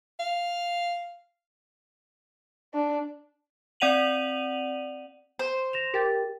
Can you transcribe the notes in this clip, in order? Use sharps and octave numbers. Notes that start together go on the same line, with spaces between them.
F5
D4
C4 D5 F#5 D#7 F7 F#7
C5
A#6 E7 F7
G4 A#4 G5 A6